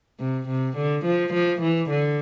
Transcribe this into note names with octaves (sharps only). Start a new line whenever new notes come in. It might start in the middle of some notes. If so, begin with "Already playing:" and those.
C3
C3
D3
F3
F3
E3
D3